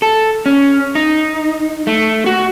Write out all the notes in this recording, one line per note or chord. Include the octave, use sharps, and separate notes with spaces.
A4
C#4
D#4
A3
F#4